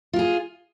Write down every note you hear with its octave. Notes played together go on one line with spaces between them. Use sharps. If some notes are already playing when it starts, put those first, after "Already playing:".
F4 G4 G#4